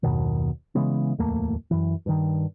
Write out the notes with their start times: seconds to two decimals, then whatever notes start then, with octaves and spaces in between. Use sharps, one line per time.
0.03 F#1 D#2 B2 D#3
0.75 C#3 E3 G#3 B3
1.18 D1 E2 A3 A#3
1.71 F#2 E3
2.06 G2 D#3